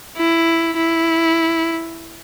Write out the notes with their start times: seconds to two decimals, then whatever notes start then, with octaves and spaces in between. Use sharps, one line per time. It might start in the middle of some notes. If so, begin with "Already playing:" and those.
0.17 E4
0.76 E4